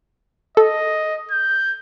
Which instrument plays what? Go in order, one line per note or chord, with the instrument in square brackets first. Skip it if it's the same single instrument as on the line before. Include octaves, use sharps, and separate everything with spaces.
[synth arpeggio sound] A4 [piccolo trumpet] D#5
[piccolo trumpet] G6